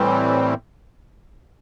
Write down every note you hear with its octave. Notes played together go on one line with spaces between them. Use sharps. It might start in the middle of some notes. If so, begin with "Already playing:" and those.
Already playing: A2 E3 G3 C4